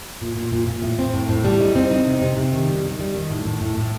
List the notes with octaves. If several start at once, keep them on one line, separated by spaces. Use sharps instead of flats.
A#2
A#2
A#2
A#2
A2
C4
A2
A2
G3
D#4
C4
D#4
C3
C3
C3
D#3
G3
D#3
G3
D#3
A2
A2
A2
A2